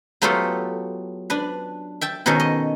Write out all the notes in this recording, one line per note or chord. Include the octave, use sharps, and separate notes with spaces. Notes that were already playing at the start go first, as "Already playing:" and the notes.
F#3 A3 B3 F4 G4 A4
D4 B4
E5 G5 A5
B2 D#3 C#4 D#4 A4
D#5